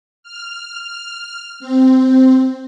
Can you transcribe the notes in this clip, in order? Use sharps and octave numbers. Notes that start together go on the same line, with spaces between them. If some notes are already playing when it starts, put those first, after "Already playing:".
F6
F6
C4